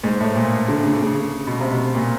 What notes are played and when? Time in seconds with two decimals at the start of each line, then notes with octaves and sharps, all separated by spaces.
0.04 G#2
0.20 A2
0.35 A#2
0.68 D3
0.83 C#3
0.92 D3
1.02 C#3
1.47 B2
1.60 C3
1.72 B2
1.94 A#2